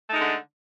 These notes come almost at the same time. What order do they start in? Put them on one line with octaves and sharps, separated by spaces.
A3 D#4 G#3 D3